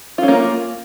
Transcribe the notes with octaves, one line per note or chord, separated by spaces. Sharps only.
A#3 C#4 F4